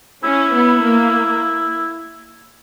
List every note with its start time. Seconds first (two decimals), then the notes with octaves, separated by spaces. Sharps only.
0.24 C#4 E4
0.53 B3
0.82 A#3